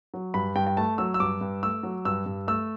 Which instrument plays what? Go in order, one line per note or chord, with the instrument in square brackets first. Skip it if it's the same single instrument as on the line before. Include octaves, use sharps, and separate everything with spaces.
[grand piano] F#3
G2 B5
G2 G5
G5
A3 A5
F#3 E6
E6
G2 D6
G2
A3 E6
F#3
G2 E6
G2
A3 E6